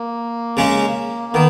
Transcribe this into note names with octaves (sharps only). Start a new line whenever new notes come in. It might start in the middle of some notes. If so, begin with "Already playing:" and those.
Already playing: A#3
C#3 G#3 C#4
D#3 B3